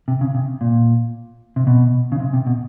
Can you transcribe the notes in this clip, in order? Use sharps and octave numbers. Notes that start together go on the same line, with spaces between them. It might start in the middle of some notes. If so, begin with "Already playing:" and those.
C3
C#3
C3
A#2
C3
B2
C#3
C3
C3
B2